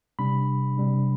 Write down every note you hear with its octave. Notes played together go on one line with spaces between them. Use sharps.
C3 G3 D4 B5
C3 G3 D4